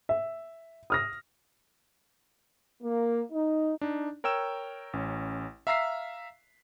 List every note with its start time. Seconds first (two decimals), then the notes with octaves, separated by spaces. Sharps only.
0.09 E5
0.90 D#6 F6 A#6
2.82 A#3
3.32 D#4
3.81 D4 D#4
4.24 A#4 C#5 G5 E6 E7
4.93 A1 C#4
5.67 E5 F5 A#5 E6 B6 C7